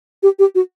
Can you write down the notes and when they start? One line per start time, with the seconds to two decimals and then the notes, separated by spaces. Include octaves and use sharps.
0.23 G4
0.39 G4
0.55 F#4